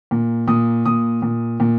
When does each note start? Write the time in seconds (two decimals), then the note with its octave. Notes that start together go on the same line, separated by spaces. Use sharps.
0.11 A#2
0.48 A#2 D#6
0.85 A#2 D#6
1.22 A#2
1.60 A#2